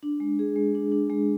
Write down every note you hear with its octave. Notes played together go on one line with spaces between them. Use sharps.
D4
G#3
G#4
G#3
D4
D4
G#3